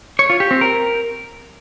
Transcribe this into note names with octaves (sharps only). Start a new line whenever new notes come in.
C#5
F4
G4
C4
A#4